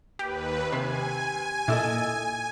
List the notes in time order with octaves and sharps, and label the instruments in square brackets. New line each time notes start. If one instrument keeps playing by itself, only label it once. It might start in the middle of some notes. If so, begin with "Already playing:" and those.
[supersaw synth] D#2 B4 [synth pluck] G4
[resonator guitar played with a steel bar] C3 [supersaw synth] G#5
[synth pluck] A#2 [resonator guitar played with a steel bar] E4 A4 D#5